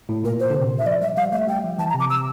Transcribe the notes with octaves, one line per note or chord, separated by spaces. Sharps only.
A2
A#2 A#4
A#2 C5
D3
C3
E5
F3 D5
G3 E5
G3 F5
A3 E5
G3 G5
F3
E3 A5
A#5
C3
D6
E6